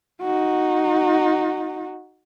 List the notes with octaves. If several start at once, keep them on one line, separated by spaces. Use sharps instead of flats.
D#4 F#4